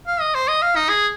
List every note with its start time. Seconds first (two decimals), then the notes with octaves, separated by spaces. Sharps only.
0.07 F5
0.21 D#5
0.35 C5
0.48 D#5
0.62 F5
0.76 D#4
0.89 G#4